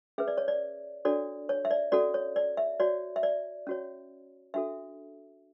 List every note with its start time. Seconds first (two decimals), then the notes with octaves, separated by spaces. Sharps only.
0.18 C#4 G#4 B4 E5
0.28 D5
0.38 C#5
0.48 D5
1.05 D4 F#4 A4 C#5 D5
1.49 C#5
1.65 E5
1.71 D5
1.92 C#4 F#4 A4 D5
2.14 C#5
2.36 D5
2.57 E5
2.80 F#4 C#5 D5
3.16 E5
3.23 D5
3.67 C#4 F#4 C#5
4.54 D4 F#4 A4 E5